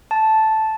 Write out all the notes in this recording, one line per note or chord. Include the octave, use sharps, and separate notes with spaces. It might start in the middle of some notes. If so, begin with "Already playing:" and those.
A5